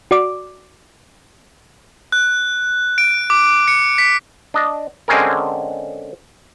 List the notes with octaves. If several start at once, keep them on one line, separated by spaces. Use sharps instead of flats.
F#4 D5 D6
F#6
D7
D6
C#7
B6
D4 D#5
D3 G#3 C4 C#4 G#4 A#4